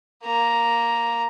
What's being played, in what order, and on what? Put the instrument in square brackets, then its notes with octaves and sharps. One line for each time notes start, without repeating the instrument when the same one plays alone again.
[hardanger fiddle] A#3 A#5